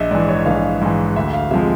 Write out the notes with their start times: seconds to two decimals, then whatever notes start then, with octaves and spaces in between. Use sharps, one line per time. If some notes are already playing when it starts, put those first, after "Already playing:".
Already playing: A#1 D#5 E5
0.11 G#2 E3 D5
0.29 C#5
0.46 A#1 F5
0.81 G#2 E3
1.16 D2 E5
1.33 F5
1.51 C3 F3 G#3 E5